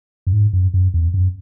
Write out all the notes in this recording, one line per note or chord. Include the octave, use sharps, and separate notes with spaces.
F#2
G#2
F#2
F#2
E2
F#2